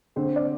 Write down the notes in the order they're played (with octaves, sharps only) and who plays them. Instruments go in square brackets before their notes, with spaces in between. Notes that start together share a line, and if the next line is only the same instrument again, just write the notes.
[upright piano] D3 C4 C5
D5